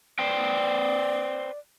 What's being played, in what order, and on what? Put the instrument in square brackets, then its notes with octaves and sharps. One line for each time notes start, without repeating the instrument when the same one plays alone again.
[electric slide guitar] B4 C5 G5 [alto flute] D5